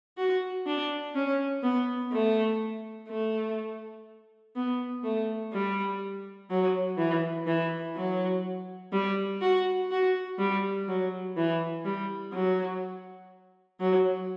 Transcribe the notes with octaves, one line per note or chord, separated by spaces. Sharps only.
F#4
D4
C#4
B3
A3
A3
B3
A3
G3
F#3
E3
E3
F#3
G3
F#4
F#4
G3
F#3
E3
G3
F#3
F#3